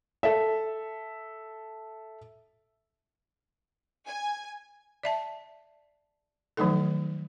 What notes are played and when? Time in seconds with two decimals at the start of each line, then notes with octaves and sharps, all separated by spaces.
0.23 A4 E5
4.07 G#5
5.03 D5 E5 A5
6.57 D#3 F3 F#3 A3 D#4 A4